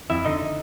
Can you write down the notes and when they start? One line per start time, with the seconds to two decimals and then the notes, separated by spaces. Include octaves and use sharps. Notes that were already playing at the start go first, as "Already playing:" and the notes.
0.10 F2 E4 E5
0.25 D3 D#4 D#5